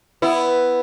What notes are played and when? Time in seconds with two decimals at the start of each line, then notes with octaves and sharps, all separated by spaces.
0.22 B3 E4